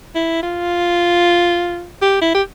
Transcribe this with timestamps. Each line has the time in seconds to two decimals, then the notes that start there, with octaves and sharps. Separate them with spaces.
0.15 E4
0.43 F4
2.02 G4
2.22 E4
2.34 G4